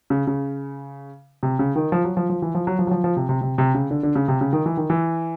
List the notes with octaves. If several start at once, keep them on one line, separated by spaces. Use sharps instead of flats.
C#3
C#3
C3
C#3
D#3
F3
F#3
F3
F3
E3
F3
F#3
F3
F#3
F3
F3
C3
C3
C3
C3
C#3
D3
D3
C#3
C3
C#3
D#3
E3
D#3
E3